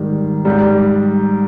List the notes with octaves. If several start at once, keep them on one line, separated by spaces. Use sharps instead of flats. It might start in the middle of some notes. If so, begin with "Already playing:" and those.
Already playing: G#2 D#3 G3
G#2 G3